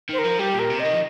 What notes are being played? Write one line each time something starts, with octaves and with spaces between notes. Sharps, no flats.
D#3 C5
A#4
F3
G3 G4
A#2
A#4
C3
D#5
D#3
F3